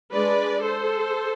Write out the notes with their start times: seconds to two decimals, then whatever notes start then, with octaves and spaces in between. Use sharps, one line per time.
0.12 G#3 D4 B4 D5
0.61 A4 C5